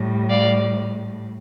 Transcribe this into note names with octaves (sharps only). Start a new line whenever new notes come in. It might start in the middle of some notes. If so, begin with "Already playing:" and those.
Already playing: A2 G3
D5 F5